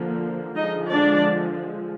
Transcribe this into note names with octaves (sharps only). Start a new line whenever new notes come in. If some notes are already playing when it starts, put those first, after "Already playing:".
Already playing: D3 F3 A#3
D3 F3 G#3 D#4 D#5
D4 D5